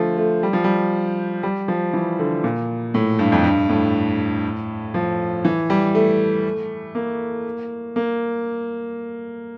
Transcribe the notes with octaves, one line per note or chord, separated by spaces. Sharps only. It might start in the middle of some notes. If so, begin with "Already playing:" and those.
Already playing: D3 F3 A3
A3
G3
F3
G3
G3
F3
E3
D3
A#2
A2
G2
F2
G2
A2
F3
E3
G3
A3
A#3
A#3